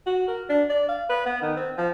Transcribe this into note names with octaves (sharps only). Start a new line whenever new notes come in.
F#4
A#4
D4
D5
F5
B4
B3
D#3
C4
F3